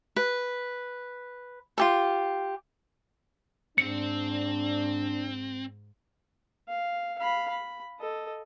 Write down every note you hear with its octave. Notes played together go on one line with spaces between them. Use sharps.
B4
F4 G4 A4
G#2 C4 D4 C#7
F5
F5 B5
B5
A4 D#5